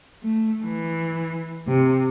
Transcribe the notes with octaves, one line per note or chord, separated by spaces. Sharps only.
A3
E3
C3